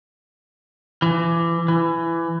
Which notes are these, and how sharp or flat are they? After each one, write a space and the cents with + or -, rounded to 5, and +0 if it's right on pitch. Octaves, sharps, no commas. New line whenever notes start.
E3 +30
E3 +20